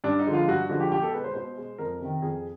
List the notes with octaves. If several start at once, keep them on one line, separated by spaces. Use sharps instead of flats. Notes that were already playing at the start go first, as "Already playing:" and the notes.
G2 D4
D#4
D3 F3 G#3
F4
G2 F#4
D3 F3 G#3 F#4
G4
B2 G4
A4
G#3 B4
C5
B2 C5
G#3
F2 A#4
C3 D#3
F2 G#4